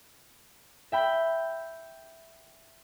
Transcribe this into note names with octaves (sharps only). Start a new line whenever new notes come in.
E5 G5 B5